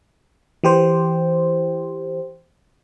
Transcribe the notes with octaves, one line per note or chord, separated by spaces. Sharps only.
E3 G4 C5